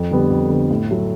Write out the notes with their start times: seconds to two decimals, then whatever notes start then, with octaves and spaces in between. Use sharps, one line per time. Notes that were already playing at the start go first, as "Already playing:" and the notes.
Already playing: F2
0.11 D3 G3 B3
0.30 F2
0.50 D3 G3 B3
0.71 A2
0.91 F#3 A3